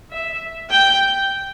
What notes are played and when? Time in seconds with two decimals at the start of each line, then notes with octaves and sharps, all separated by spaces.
0.12 E5
0.70 G5